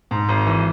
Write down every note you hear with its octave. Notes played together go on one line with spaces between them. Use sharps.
G#2
G#1
E3